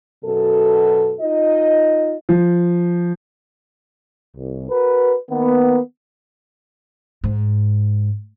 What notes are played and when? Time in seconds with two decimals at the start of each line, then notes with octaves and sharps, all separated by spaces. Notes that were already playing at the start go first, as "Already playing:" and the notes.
0.24 F#2 B2 A4
1.20 D#4 F4 D#5
2.29 F3
4.37 C2
4.69 F#4 A#4 B4
5.31 D#3 A#3 B3
7.24 G#2